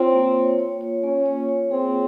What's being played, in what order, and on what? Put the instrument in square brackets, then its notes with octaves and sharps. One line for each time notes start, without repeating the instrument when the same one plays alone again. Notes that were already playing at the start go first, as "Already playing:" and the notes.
Already playing: [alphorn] C4 [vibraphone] F4 C#5
[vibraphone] A#3
C#5
C#5
C#5
[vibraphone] A#3 [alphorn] C#4
[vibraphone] C#5
C#5
[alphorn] C4 [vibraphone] G#4